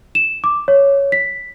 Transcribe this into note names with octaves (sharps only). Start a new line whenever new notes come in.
E7
D6
C#5
B6